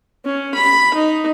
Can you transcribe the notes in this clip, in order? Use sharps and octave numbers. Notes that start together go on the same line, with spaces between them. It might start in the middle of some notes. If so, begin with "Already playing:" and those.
C#4
B5
D#4